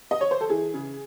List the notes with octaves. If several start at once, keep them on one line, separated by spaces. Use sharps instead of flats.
D#5
C#5
C5
A4
E3 G#4
C#3